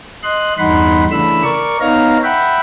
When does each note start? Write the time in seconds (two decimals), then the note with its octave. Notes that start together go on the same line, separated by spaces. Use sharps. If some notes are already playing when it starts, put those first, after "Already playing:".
0.23 D#5 C6 F#6
0.58 E2 G2 D#4 F#5 B5 C6
1.11 C#3 E3 A3 D4 B5 E6
1.43 A#4 D5 C#6
1.80 B3 D#4 C#5 F5 A#5
2.24 E5 F#5 G5 B5